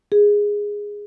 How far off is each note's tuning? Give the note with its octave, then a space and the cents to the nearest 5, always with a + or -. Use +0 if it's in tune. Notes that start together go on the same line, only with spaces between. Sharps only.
G#4 -10